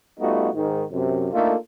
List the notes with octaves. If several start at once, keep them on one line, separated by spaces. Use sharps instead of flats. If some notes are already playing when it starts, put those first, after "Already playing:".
G3 A3 B3 D#4 F4 F#4
G#2 D#3
F#2 C3
A3 A#3 D4 D#4 F4 A4